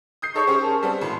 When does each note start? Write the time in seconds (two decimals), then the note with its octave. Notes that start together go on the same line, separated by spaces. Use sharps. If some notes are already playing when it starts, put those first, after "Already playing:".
0.22 D#6 G6 C7
0.34 D#4 G#4 A4 C#5 C#6
0.47 C#4 G4 C5
0.61 A#4 G#5 A5
0.83 G3 B3 C4
1.01 G#1 A2 E4 C6